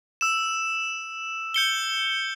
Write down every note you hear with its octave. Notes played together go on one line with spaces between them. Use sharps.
E6 E7
G6 C#7 G7